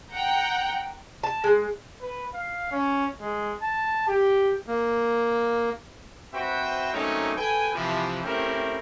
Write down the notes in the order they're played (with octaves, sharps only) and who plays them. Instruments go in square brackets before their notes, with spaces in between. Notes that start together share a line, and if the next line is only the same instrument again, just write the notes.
[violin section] F#5 G5 A#5 G6
[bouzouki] A5
G#3
[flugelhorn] B4
F5
C#4
G#3
A5
G4
[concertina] A#3
[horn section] C4 F#4 B4 C5 E5 G5
F#3 A3 A#3 C4 C#4 D#4
A4 B4 G5 G#5
C3 E3 F3
A3 C4 C#4 E4 G4 A#4